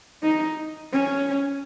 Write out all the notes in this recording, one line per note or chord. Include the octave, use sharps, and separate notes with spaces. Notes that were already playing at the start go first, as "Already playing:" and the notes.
D#4
C#4